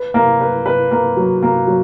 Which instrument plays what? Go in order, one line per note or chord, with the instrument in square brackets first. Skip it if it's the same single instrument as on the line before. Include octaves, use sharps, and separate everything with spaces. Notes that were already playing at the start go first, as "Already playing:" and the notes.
Already playing: [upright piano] B4
A#3
B4
B4
A#3
F#3
A#3
F#3